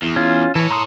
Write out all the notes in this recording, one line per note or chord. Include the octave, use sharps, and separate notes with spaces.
E2
C#4 F4
E3 A4 C#5
A#5 C6 D#6